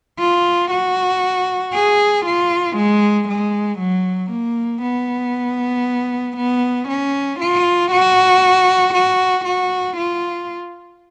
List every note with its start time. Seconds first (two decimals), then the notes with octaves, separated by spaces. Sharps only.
0.19 F4
0.71 F#4
1.73 G#4
2.25 F4
2.76 G#3
3.28 G#3
3.79 F#3
4.31 A#3
4.82 B3
6.37 B3
6.88 C#4
7.39 F4
7.91 F#4
8.94 F#4
9.44 F#4
9.97 F4